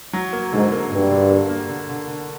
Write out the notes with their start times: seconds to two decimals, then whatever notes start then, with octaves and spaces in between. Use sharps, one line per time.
0.13 F#3
0.33 A#3
0.52 G#2 D3
0.72 A#3
0.91 G2 A#3
1.11 D3
1.30 A#3
1.49 A#3
1.69 D3
1.89 D3
2.08 D3